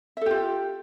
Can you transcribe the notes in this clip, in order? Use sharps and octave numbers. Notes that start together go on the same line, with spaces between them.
F4 G4 A4 E5